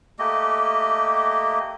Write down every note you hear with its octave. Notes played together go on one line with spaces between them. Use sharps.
A3 A#3 G4 D#5